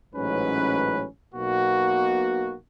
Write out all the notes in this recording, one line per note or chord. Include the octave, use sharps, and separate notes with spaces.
A1 G#2 F#3 C#4 B4
B1 B2 A#3 F#4